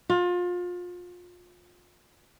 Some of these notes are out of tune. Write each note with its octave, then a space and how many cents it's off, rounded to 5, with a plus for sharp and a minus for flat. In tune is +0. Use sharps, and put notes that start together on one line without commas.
F4 +30